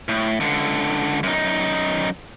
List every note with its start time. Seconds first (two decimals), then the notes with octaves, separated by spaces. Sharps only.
0.08 A2
0.40 C#2 D3
1.23 F#2 D#4